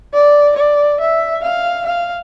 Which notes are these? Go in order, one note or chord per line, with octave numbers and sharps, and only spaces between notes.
D5
D5
E5
F5
F5